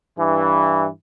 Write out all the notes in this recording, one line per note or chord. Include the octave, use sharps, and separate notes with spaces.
G2 E3